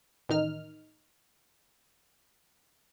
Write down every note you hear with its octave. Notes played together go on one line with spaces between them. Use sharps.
A1 D#3 D#4 F6